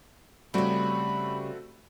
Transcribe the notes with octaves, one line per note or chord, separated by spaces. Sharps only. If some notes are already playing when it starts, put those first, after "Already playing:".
C#3 G3 A3 C4 F#4 B5